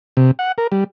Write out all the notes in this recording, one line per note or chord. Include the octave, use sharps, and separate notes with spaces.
C3
F#5
A#4
G3